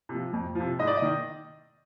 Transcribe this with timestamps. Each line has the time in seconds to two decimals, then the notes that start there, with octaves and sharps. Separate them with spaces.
0.09 C3
0.14 F3
0.33 F2
0.55 C3 F3
0.79 G#2 D#5
0.87 D5
0.97 D#5
1.02 D#3